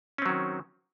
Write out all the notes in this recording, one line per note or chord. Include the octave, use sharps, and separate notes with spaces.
D#3 F#3 C4 C#4